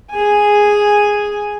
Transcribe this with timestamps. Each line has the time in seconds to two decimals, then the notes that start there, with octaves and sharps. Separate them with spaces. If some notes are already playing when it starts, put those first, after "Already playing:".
0.10 G#4 G#5